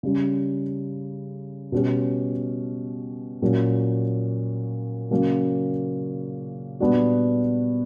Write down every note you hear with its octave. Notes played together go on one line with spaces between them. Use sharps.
C#3 G3 C#4
B2 G3 C#4 G4
A#2 F#3 C#4
C#3 F#3 A#3 C#4
A#2 G3 B3 D4 F#4